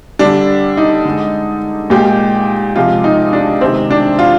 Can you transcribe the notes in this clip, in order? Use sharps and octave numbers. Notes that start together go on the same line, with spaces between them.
D3 G3 D4
D#4
D3 G#3
A#2 G#3 G4
C3 F3 G#3 F4
D#4
D4
C3 D#3 G#3 C4
D4
F4